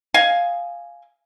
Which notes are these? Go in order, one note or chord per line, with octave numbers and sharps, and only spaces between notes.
D#5 F5 G#5